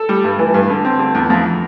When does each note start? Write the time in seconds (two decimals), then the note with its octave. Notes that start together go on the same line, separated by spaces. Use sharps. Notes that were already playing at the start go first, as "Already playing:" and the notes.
Already playing: A4
0.09 G3
0.24 G2
0.39 E3
0.54 G2
0.70 D3
0.85 C4
0.99 D3
1.15 E2
1.30 F2